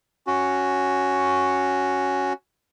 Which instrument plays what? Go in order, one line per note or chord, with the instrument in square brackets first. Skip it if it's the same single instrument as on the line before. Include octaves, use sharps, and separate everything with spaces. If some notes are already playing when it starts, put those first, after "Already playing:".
[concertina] C#4 F#4